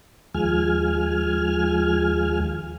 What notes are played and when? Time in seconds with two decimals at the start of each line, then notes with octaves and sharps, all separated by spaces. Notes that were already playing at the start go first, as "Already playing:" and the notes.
0.34 D#2 F3 G#3 G#5 F6